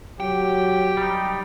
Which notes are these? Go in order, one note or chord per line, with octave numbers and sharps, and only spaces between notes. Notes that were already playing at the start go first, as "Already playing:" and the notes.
F#3 G4 G5
G3 D#4